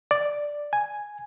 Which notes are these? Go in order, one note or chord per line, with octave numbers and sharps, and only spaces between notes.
D5
G#5